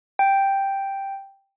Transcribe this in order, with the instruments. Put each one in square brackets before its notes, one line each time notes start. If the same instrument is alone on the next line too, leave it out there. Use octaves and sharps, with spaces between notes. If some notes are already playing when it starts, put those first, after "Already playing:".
[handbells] G5